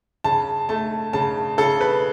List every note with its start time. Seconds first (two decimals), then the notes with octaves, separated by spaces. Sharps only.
0.24 C#3 A5
0.69 A3 A5
1.13 C#3 A5
1.58 C#3 A4
1.81 B4